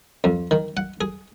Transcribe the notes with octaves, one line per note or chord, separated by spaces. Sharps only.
F2
D#3
F#5
G#4